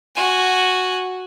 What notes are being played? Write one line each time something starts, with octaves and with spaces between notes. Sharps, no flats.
F#4 G#5